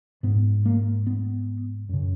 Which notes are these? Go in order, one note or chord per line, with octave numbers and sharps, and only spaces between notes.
G#2 B3
A#3
B3
F#2 C#3